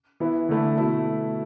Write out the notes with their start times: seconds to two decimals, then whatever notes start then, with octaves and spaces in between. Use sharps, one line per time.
0.20 E3 B3 E4
0.49 D3 A3 E4
0.78 B2 A3 E4